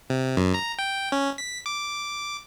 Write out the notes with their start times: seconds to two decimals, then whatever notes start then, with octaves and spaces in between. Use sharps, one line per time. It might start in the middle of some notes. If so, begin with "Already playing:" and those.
0.10 C3
0.37 F#2
0.54 A#5
0.79 G5
1.12 C#4
1.38 B6
1.66 D6